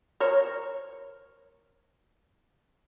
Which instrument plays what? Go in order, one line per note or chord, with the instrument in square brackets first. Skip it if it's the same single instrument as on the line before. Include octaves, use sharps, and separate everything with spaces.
[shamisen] A#4 C5 C#5